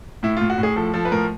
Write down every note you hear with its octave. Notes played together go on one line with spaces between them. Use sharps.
A2 E4
F4
A2
F#4
A2
G#4
F3 A4
F3 A4
B4
A2 A#4